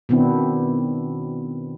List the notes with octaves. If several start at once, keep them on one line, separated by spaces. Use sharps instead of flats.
B2 D#3 B3 C4 D4 E4